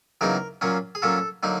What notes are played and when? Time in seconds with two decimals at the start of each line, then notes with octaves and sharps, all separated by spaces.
0.21 E2 C#3 F#3 A#3 D#4 A#4
0.61 A#2 F#3 A#3 C#4
0.95 G#4
1.02 A#2 F#3 A#3 C#4 A4
1.43 D3 F#3 A#3 D#4